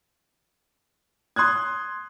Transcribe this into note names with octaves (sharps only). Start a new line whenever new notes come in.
C6 D#6 F#6 G#6